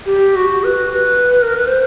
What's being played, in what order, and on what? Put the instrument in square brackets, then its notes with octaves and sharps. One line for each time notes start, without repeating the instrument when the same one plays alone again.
[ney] G4
F#4
B4
B4
A#4
B4
C5